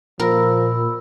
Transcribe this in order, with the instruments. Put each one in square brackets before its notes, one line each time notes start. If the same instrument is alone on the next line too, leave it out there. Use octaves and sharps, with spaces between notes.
[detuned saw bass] A#2 [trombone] F3 [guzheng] A#4 [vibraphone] B5 E6